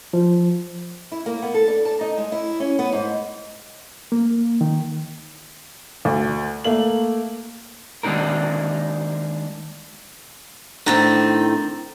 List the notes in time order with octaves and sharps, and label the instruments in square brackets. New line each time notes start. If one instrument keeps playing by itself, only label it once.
[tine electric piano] F3
[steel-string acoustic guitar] E4
A#3
B3
A4
D4
A5
D#4
G#3
E4
C#4
B3
G#2
[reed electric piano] A#3
D#3
[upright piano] D2
A3 A#3 F#7
[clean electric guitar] D#3 G#3 A#3 D4 D#4 A#4
[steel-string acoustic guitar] A2 D#3 C4 [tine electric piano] D4 A#5 A6